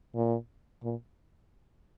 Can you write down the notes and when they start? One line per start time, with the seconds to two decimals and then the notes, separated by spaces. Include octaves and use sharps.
0.14 A#2
0.83 A#2